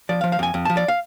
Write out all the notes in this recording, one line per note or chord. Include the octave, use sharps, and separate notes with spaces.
F3 D5
F5
F3
F5
F2 G#5
F2
F3 A5
D5
F5